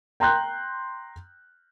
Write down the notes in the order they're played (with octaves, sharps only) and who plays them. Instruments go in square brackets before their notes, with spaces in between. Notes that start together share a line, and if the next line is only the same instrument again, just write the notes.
[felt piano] G5 A#5 C6 F#6 G6